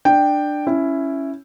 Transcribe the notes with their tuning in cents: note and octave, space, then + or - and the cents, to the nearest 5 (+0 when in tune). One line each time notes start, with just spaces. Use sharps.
D4 +15 G5 +0
C#4 +0 E4 +5